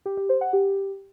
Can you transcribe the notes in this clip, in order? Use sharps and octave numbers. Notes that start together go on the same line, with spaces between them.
G4
G4
C5
F#5
G4